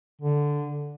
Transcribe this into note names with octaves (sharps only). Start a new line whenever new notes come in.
D3